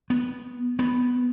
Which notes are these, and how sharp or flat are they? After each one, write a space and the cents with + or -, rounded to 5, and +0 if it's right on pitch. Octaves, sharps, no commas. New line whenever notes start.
B3 -10
B3 +0